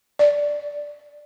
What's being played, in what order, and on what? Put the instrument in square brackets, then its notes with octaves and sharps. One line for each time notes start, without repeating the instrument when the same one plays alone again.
[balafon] D5